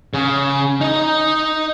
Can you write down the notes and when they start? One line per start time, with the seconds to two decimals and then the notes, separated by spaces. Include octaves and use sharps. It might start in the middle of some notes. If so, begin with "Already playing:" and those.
0.14 C#3
0.81 D#4 D#5